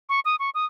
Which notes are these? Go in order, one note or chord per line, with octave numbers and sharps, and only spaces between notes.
C#6
D#6
C#6
D#6